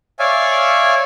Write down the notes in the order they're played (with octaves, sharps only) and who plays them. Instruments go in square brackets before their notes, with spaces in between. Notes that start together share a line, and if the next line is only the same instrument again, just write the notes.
[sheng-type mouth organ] C#5 D5 E5 F5 G#5